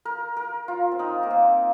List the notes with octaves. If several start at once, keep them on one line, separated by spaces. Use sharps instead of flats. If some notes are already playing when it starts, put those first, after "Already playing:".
A#4
A#4
F4
C4
D#4
A#3
C4